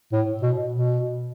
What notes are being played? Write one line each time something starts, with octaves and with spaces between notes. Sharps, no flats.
A2
B2
B2